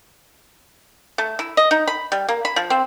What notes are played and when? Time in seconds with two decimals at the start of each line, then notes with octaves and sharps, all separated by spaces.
1.18 A3
1.39 E4
1.57 D#5
1.71 D#4
1.87 B5
2.12 G3
2.29 A#3
2.45 B5
2.56 F3
2.70 C4